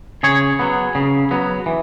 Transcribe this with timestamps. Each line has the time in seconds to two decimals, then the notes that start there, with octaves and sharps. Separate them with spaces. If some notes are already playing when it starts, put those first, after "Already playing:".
0.23 C#3 G#4 C#5
0.59 F#3 B3
0.95 C#3
1.31 F#3 B3
1.66 E3